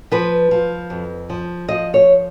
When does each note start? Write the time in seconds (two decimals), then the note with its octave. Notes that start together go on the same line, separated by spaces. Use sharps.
0.12 F3 B4
0.51 F3
0.90 F2
1.30 F3
1.69 F3 D#5
1.94 C#5